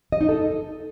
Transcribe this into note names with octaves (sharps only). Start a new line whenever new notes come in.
D#5
D#4
A4